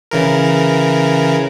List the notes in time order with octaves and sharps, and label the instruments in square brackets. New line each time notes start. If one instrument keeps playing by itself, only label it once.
[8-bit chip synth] C#3 E3 A#4